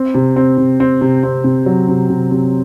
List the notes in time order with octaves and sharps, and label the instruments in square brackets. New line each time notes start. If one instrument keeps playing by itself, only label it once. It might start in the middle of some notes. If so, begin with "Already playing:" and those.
Already playing: [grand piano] C4
C3
C4
C3
C4
C3
C4
C3
F#3
C3
C3
C3